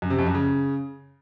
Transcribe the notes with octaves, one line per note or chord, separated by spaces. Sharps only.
F#2
C3
F2
F#2
C#3